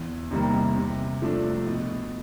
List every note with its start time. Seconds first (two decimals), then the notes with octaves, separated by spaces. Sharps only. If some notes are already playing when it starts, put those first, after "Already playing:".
Already playing: E2
0.31 C3 D#3 G3 A#3
0.76 C3
1.22 F3 A3 D4
1.67 B2